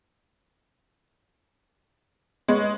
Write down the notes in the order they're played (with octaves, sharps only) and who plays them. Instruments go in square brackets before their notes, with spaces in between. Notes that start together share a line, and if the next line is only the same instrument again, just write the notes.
[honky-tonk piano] G#3 [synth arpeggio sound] B3 C#5